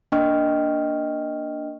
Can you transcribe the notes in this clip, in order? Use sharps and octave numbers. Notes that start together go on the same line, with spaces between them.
A#3 D4 D#5 G5 C#6 F6